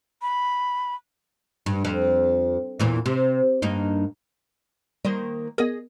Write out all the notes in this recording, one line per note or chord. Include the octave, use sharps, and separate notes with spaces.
B5
G2
F2
E2 A#2 E3
C3
G2 A#3 D#4
D#3 G3 A#3 C5
B3 G#4 A#4 D#5